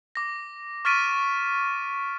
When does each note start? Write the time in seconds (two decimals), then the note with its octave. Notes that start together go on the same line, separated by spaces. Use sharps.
0.15 D6 A#6
0.85 C#6 F6 A6 B6 D7 D#7